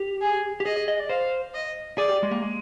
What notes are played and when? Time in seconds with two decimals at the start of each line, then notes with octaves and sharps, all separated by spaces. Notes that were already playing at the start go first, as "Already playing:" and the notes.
Already playing: G4
0.21 G#4
0.60 G4
0.65 G#4 D#5
0.88 D#5
1.00 D5
1.09 C5 F5
1.54 D#5
1.97 G#4 D5
2.09 G4
2.23 G#3
2.31 A#3
2.42 G#3